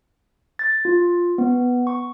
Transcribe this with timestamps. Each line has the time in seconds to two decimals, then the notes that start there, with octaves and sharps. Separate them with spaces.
0.59 A6
0.85 F4
1.38 B3
1.87 C#6